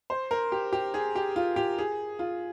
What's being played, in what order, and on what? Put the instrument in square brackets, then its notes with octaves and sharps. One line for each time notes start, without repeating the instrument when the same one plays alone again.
[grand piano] C5
A#4
G4
G4
G#4
G4
F4
G4
G#4
F4